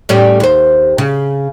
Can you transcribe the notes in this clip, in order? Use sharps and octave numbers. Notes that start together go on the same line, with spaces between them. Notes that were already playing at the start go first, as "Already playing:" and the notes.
A2 G3 C#4
D#2 C5
C#3